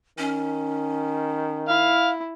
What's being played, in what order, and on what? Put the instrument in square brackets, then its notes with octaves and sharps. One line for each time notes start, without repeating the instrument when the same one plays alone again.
[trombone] D#3 [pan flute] C#4
[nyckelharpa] E4 [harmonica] F5